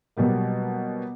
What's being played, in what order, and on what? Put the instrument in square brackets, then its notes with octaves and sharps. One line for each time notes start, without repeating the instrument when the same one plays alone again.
[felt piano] B2 F#3 G3 A#3